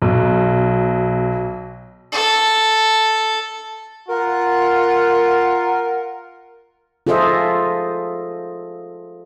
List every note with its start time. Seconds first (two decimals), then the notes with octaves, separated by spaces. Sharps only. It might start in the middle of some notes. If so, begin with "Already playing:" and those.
0.02 B1
2.12 A4
4.08 F4 A#4 F#5
7.07 F4 G#4 A4 C5 D#5 E5